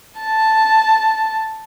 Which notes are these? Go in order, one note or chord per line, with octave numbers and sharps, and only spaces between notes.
A5